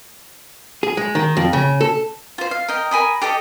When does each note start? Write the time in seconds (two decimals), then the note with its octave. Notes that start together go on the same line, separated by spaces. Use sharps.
0.83 G#4
0.97 G#3
1.15 D#3
1.37 F2
1.53 C#3
1.81 A4
2.38 F4 C5
2.51 F5
2.68 A#4 D#5 G5
2.91 A#4 G#5 B5 D#6
3.22 G4 A4 D#5 D6